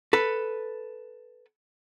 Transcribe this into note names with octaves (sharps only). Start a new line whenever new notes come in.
A4 B4